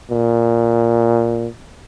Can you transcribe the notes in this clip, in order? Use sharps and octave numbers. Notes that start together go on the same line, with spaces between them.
A#2